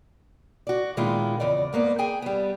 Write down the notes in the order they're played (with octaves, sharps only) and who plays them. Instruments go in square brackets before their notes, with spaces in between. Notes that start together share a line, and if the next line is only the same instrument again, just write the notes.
[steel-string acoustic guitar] F#4 D5
A#2 D#3 G#3 B3 E4 F4
E2 C#3 D5 D#5
G#2 A#3 B3 D5
G#4 G5 G#5
G3 B3